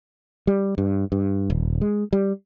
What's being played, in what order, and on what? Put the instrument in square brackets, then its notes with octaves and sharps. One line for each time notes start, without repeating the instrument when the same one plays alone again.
[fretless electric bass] G3
G2
G2
D#1
G#3
G3